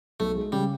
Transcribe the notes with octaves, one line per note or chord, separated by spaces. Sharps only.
B1 A3
G#3
C#3 G3